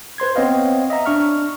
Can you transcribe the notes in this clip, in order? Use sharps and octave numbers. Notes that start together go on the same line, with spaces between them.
B4 C5 C6 G#6
B3 C4 C#5 D#5 F5
D#5 E5 A#5
D4 C#6 F6